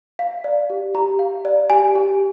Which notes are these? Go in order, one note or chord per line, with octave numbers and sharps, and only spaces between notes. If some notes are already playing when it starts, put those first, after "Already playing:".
F5
D5
G4
G4 A#5
F5
D5
G4 G#5
G4